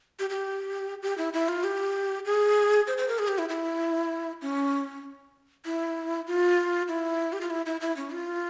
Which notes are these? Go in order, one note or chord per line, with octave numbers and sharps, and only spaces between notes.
G4
G4
G4
E4
E4
F4
G4
G#4
C5
C5
A#4
G#4
G4
E4
E4
C#4
E4
F4
E4
G4
F4
E4
E4
E4
C#4
F4